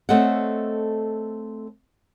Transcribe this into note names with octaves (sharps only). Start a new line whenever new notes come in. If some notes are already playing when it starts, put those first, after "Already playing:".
A3 C4 A4 C#5 D#5 F#5